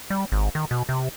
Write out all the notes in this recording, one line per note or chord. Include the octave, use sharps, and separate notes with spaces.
G3
G#1
D#3
B2
C3